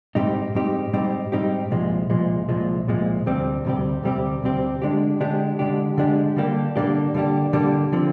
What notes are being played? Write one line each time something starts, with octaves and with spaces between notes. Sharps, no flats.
G#2 G3 C4 D#4 G4
G#2 G3 C4 D#4 G4
G#2 G3 C4 D#4 G4
G#2 G3 C4 D#4 G4
C2 A#2 F3 G#3
C2 A#2 F3 G#3
C2 A#2 F3 G#3
C2 A#2 F3 G#3
D2 C3 G3 C4 G4
D2 C3 G3 C4 G4
D2 C3 G3 C4 G4
D2 C3 G3 C4 G4
D3 G#3 D4 G4
D3 G#3 D4 G4
D3 G#3 D4 G4
D3 G#3 D4 G4
D3 G3 A#3 D4 G4
D3 G3 A#3 D4 G4
D3 G3 A#3 D4 G4
D3 G3 A#3 D4 G4
D3 F3 C4